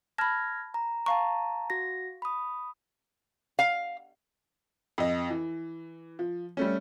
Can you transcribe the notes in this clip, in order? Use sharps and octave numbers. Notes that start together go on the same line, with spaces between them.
A5 B5 F6 G#6 A#6
A#5
F5 A5 A#5 C#6
F#4 A#6
B5 D#6
F5
F2 D#5
E3
F3
G3 A3 C#4